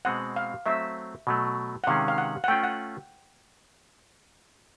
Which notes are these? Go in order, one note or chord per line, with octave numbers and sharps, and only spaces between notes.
B2 G#3 C4 F#5
F5
F#3 A3 C4 E5
B2 F#3 A3
F#5
C3 D#3 G#3 C#4 F5
F5
F#5
F#5
A3 C#4 F4 G5
F#5